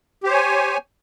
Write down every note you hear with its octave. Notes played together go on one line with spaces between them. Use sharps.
G4 C5 C#5 G#5